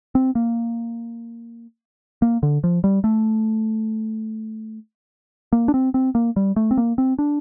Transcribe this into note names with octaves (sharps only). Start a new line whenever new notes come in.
C4
A#3
A#3
D3
F3
G3
A3
A#3
D4
C4
C4
A#3
G3
A3
C4
A#3
C4
D4